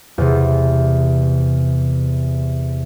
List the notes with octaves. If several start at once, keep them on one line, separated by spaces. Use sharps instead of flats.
E2 C3